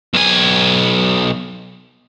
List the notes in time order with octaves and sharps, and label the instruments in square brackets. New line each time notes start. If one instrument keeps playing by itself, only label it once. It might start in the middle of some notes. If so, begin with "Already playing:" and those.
[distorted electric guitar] B1 G#5